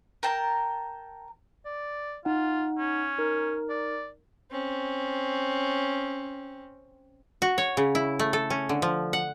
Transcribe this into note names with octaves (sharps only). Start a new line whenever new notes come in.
A#4 G5 A5
D5
D#4 F4 F#5
C#4
D#4 A#4
D5
C4 C#4
F#4
C#5
C#3
E4
A3
A4
C#4
D3
F3
F#5